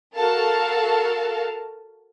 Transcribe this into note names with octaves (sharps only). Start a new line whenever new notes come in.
F#4 A4 A#4 F5 A5